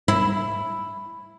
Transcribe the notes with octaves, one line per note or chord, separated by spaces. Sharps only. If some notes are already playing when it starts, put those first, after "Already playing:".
E4